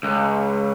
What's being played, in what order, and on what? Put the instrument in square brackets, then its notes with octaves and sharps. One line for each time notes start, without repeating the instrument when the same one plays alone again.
[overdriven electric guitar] C#2